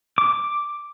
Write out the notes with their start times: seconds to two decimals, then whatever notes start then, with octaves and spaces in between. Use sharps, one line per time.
0.18 D6